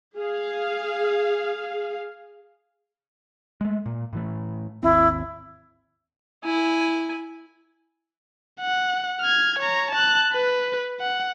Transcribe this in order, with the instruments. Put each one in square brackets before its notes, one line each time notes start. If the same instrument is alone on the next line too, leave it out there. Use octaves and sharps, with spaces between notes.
[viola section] G#4 F5
[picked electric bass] G#3 A3
A#2
A2 E3 A3
[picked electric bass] G#1 D#2 C4 [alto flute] E4
[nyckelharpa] E4 G#5
[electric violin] F#5
F6 G#6
C#5 A#5
A5 F#6
B4
F#5